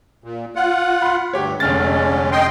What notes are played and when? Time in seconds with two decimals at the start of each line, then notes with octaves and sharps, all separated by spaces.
0.24 A#2
0.56 F4 F#5
1.02 B5 C6
1.33 D2 G2 G4 C#5
1.60 F1 D3 G#3 C#4 F6 A6
2.32 D#5 G5 C6